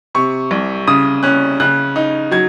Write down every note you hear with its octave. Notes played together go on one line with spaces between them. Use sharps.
C3 C#6
C2
C#3 D#6
C#4 F#6
C#3 F#6
D#4
F#3 G#6